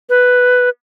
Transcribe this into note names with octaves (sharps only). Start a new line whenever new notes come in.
B4